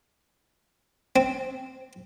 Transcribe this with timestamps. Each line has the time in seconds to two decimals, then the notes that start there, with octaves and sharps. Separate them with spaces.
1.16 C4